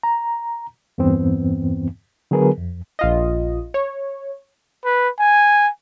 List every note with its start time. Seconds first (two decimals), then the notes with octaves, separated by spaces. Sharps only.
0.03 A#5
0.98 E2 G2 E3 B3 C4
2.31 D3 F#3 B3 G#4 A#4 B4
2.58 F2
2.99 A#1 F4 D#5
3.74 C#5
4.85 B4
5.20 G#5